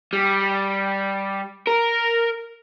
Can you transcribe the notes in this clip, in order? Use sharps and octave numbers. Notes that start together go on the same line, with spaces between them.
G3
A#4